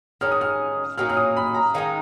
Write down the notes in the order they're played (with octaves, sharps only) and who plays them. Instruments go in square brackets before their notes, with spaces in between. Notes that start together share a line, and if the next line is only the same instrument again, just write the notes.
[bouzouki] D#3 G#3 C#4 [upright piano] F6
[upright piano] D#6
F6
[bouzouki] A#2 F#3 A#3 D#4 [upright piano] F6
[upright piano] F6
D#6
B5
A#5
[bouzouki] D#3 G#3 D#4 [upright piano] F5